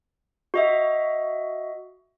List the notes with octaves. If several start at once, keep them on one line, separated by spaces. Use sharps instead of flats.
F#4 D#5 E5